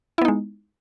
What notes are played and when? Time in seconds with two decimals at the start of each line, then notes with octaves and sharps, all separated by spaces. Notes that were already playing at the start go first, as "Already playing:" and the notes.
0.18 E4
0.21 B3
0.25 D#4
0.28 G#3